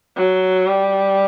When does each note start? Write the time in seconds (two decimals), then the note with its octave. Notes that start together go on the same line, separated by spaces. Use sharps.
0.17 F#3
0.68 G3